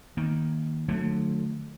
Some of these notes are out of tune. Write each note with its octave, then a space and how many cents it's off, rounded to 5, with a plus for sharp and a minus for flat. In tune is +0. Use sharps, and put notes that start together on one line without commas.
D#3 +5 A#3 +0
D3 +35 F#3 -30 A3 +0